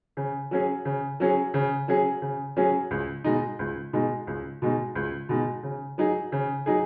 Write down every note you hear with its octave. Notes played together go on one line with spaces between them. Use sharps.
C#3
F#3 C#4 G#4
C#3
F#3 C#4 G#4
C#3
F#3 C#4 G#4
C#3
F#3 C#4 G#4
C#2
B2 G#3 D#4
C#2
B2 G#3 D#4
C#2
B2 G#3 D#4
C#2
B2 G#3 D#4
C#3
F#3 D#4 G#4
C#3
F#3 D#4 G#4